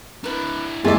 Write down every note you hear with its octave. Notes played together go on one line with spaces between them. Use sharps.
D4 E4 A#4 B4
D#2 A2 G#3 A#3 F4 G#4 D5 E5